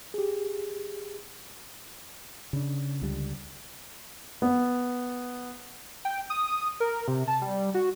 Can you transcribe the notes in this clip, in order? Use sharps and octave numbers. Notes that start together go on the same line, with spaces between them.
G4 G#4
C#3 D4
C#2 D3 G3
B3
G5
D#6
A#4
C3
A5
G3
F#4